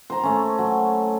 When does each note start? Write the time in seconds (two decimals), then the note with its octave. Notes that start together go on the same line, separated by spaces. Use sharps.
0.10 C5 A#5
0.23 A3 C#4
0.59 F#3